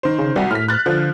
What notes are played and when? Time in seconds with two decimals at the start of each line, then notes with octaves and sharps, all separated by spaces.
0.03 D#3 C5
0.19 C#3
0.36 C2 G3 F#4
0.51 A2 F6 B6
0.68 F#6 A6
0.86 D3 F3